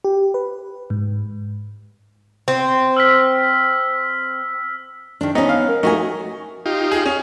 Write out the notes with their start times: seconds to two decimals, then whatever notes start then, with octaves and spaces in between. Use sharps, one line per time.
0.05 G4
0.34 B4
0.90 G#2
2.48 C4
2.97 E6 F6 B6
5.21 D#3 D4
5.35 B3 C#4 D#4
5.49 F5
5.68 A#4
5.83 A3 D#4 F#4 G#5
6.66 D#4 F4 G4
6.92 G#4
7.06 C#4